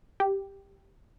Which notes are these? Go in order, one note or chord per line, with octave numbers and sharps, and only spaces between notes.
G4